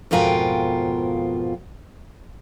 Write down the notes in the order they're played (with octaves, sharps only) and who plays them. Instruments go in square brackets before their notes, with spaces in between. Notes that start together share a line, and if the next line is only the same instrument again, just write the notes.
[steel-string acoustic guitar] F2 G#2 B2 F4 A#4 G5